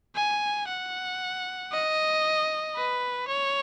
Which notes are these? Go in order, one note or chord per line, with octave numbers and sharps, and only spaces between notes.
G#5
F#5
D#5
B4
C#5